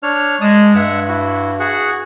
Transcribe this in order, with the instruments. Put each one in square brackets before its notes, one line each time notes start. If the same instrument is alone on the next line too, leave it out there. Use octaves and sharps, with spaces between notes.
[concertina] D4 C#5 F6
[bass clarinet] G#3 [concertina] A5 D#6
[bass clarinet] G2 [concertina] E5 F#5
[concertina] E4 F#4
F#4 G#4 F#5